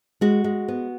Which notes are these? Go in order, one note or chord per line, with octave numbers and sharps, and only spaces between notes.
G#3 F#4
G#3
B3